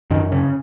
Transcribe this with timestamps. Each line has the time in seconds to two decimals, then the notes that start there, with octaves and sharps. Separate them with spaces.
0.10 F#2 D#3
0.32 C#3